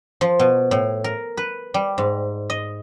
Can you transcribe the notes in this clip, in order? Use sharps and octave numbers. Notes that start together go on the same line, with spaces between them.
F3
B2
A2
A#4
B4
G3
G#2
D#5